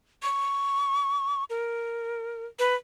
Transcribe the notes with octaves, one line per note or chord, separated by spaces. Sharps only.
C#6
A#4
B4